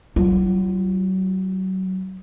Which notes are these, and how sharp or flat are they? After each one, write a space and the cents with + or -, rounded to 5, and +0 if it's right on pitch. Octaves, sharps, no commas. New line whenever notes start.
F#3 +35 F4 -25